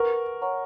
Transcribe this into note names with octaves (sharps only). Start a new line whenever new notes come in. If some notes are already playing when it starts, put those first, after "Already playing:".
Already playing: A#4 B4 F#5 C#6
C#5 F#5 A#5 C#6